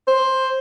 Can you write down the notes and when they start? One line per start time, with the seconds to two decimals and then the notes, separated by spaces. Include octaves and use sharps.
0.08 C5